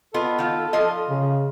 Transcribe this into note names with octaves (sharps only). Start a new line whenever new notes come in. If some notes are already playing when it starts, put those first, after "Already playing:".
B3 F4 A4 D#5
D#3 F4
F3 F4 D#5
C#3